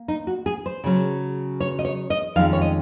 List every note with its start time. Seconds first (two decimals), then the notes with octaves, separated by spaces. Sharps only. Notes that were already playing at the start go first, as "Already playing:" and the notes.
Already playing: A#3
0.08 D#4
0.27 F#4
0.46 G#4
0.66 C5
0.84 C#3 F#3 C#4
1.60 C#5
1.79 D#5
1.85 C#5
2.10 D#5
2.36 F2 D#3 G#3 C#4 F5
2.53 C#5
2.61 D#5